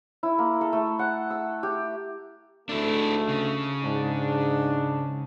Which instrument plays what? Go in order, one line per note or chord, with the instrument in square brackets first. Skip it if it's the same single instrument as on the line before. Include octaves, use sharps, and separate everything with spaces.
[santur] E4
A#3
A4
A3
F#5
E6
G4
[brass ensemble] D2 G#2 A3 [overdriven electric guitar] D4 E4
[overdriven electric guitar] C#3
[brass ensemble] G#2 D4